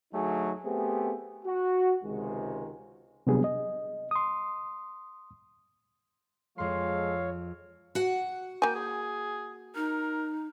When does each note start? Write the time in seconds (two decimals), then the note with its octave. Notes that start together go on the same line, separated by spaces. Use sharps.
0.13 D2 F#3 A3 D#4 G#4
0.64 A3 B3 C4 G4 G#4
1.45 F#4
2.03 C#2 C3 D#3 G#3
3.27 C3 F#3 G3 B3 D4 G#4
3.44 D#5
4.11 C6 D#6
6.58 F2 F3 G#3 A4 C#5 F5 C6
7.95 F#4 F#5
8.62 A#3 G5 G#5
8.75 G#4
9.75 D#4 A#4